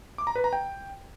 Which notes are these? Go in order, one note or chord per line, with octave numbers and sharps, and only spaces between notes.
D6
A#5
B4
A#5
G5